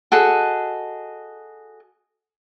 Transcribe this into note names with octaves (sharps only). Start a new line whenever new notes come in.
F#4 G#4 A4 D#5